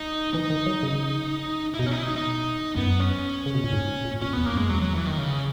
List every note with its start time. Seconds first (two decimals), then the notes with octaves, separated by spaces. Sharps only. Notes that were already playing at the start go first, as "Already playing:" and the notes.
Already playing: D#4
0.34 E3 D#4
0.50 D#3
0.66 F#3
0.83 C#3
1.74 E4
1.79 B2 D#4
1.86 C#4
1.91 D#4
1.99 E4
2.03 D#4
2.16 D#4
2.76 F#2 B3
3.00 C#4
3.46 C#3
3.55 B2
3.64 A#2
3.73 G#2
4.05 A#2
4.21 A#2 C#4
4.33 E2 B3
4.46 A#3
4.54 F#2
4.58 G#3
4.69 E2 F#3
4.81 F#3
4.94 E3
5.06 D#3
5.18 C#3